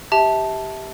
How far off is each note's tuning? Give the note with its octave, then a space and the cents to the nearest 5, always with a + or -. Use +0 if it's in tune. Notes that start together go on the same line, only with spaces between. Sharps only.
G4 +0 E5 -25 A5 -5